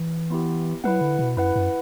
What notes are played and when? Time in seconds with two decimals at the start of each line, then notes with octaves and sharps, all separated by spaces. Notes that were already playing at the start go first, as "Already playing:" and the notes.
Already playing: E3
0.30 B3 E4 G4
0.84 F#3 E4 B4 F#5
1.01 D3
1.19 B2
1.37 F#2 E4 B4 F#5
1.56 F#2